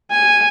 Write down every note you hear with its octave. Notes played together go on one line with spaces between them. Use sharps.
G#5